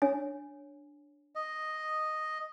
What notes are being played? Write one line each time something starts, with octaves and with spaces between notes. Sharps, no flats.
D4 C#5 G#5
D#5